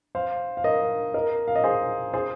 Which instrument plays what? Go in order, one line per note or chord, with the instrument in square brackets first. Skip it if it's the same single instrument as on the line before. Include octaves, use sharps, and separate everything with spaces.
[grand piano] C5 F5
F5
A#4 D#5
A#4 D#5
F5
D#5
G#4 C5
G#4 C5